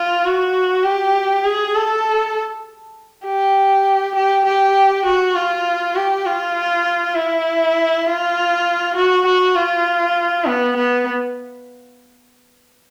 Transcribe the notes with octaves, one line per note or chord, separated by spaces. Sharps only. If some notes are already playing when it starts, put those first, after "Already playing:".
Already playing: F4
F#4
G4
G#4
A4
G4
G4
G4
F#4
F4
G4
F4
E4
F4
F#4
F#4
F4
B3
B3